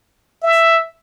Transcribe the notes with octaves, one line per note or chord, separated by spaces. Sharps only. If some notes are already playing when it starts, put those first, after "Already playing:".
E5